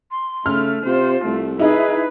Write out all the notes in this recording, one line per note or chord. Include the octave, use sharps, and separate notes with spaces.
C6
C#3 A3 F6
C3 F4 C5
C2 A3
D#4 E4 G#4 B4